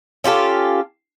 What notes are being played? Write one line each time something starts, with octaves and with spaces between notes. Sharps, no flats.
C#4 F4 G4 A4